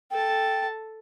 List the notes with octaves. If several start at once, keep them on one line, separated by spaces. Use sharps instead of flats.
A4 G5 A5